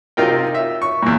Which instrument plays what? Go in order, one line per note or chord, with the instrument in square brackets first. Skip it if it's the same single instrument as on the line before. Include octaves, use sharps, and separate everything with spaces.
[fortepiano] C3 D#4 F4 A#4 G5
E5
C#6
E2 A#2